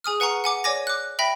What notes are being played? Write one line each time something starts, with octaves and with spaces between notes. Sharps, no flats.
G#4 G#5 D#6 F6
B4 F#5 G#5 A#5 C#6
F#5 G#5 D6
C#5 D5 G#5 D6 G#6 A#6
D6 F#6
E5 G5 B5 A#6 B6